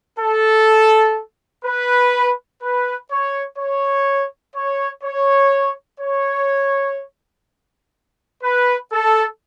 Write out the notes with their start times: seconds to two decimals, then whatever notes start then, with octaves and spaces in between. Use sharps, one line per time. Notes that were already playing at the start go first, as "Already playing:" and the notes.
0.19 A4
1.64 B4
2.61 B4
3.10 C#5
3.58 C#5
4.55 C#5
5.03 C#5
6.00 C#5
8.43 B4
8.91 A4